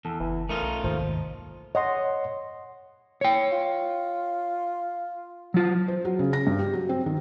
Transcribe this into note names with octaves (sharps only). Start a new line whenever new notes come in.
E2 A4
F#1 E3
A3 D#4 F4 A#4
B1
G#1 D#2 C3 F3
C#5 D#5 F#5 C6
C#5 G5
F4
F#3 F4
C5
F#3
C#3
A#6
G2
G4
F#3
C4
D#3